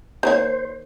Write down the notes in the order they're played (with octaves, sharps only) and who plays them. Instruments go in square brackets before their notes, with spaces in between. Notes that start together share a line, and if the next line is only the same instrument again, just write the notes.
[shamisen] D#3 A#3 C#5 [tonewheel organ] C5